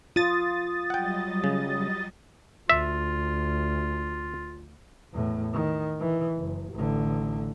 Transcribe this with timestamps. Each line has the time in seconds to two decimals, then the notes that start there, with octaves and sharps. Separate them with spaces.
0.16 F4 D#6 A6
0.90 F#3 G3 D#5 F#5 G5
1.44 C#3
2.70 D2 F4 E5
5.13 E2 A2
5.53 D#3
6.00 E3
6.37 F#1
6.74 A1 D3